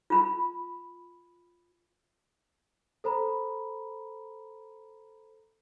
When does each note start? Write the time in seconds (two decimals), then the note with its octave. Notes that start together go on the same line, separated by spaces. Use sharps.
0.10 F4 B5
3.04 A4 C5 A#5 B5